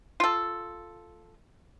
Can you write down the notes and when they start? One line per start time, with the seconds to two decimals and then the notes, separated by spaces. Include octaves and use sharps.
0.20 F4 A4